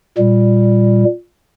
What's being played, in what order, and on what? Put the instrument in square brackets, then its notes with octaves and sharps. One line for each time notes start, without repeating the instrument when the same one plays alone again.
[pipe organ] A#2 G3